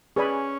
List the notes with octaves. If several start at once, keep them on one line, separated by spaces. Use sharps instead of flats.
C#4 G#4 B4 D5 G#5 B5